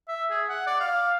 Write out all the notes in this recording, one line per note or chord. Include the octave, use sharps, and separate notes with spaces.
E5
G#4
F#5
D5
F5